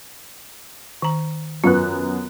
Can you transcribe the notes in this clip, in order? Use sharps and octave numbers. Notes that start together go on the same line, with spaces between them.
D#3 A#5
F#2 B3 F4 F#6